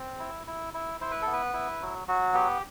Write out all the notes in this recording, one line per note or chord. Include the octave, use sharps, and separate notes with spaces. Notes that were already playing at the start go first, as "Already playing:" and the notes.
Already playing: C4
E4
E4
E4
E4 C5
B4
B3 A4
B4
E4
F#3
F#3 F#4
B3 G4